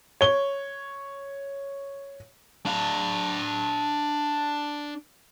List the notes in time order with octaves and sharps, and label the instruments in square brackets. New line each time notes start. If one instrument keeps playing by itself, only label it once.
[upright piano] C#5 G7
[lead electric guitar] D4 F5